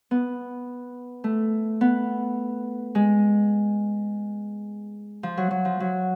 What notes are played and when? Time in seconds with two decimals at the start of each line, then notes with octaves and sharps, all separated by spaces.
0.11 B3
1.24 A3
1.81 B3
2.95 G#3
5.23 F3
5.37 F#3
5.51 F#3
5.65 F3
5.80 F#3